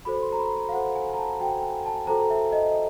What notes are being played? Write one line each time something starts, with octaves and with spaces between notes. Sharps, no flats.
F#4 A4 C5 B5
C6
A#5
B5
A#5
F5
F#4 A4 C5 F#5
G#5
A#5
A5
F#4 A4 C5 G5
G#5
A5
F#4 A4 C5 A#5
E5
D#5